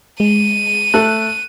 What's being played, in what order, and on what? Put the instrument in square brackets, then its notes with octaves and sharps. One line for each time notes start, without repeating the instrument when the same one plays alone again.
[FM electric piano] G#3 [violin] D#7
[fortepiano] A3 A4 [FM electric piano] F#6